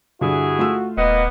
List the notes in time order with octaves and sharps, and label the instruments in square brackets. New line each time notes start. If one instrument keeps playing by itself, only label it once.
[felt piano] G2 D3 [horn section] E4 G#4 [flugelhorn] F#4
[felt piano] A3 F4 E6
[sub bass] D#1 [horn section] A#3 B3 [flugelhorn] D#5